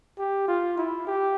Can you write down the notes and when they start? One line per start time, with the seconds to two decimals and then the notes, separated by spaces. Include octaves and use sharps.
0.19 G4
0.48 F4
0.77 E4
1.07 G4